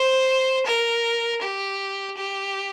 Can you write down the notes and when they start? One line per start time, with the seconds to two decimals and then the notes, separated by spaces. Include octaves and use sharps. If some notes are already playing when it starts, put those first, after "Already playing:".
Already playing: C5
0.66 A#4
1.42 G4
2.17 G4